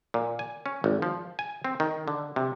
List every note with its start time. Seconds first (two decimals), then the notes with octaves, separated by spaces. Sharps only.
0.14 A#2
0.39 G#5
0.66 C#4
0.84 G#1
1.02 F3
1.39 G#5
1.64 C4
1.80 D#3
2.08 D3
2.36 C3